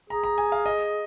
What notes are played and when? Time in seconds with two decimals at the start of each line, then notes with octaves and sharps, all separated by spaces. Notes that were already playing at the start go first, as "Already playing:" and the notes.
0.10 G#4 A#5
0.24 A#5
0.38 G#5
0.52 F5
0.66 D#5